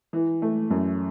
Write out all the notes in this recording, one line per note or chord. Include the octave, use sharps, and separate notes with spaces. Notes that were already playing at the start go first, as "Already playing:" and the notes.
E3
A3
F#2